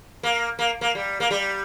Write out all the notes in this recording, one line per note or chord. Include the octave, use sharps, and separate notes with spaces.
A#3
A#3
A#3
G3
A#3
G3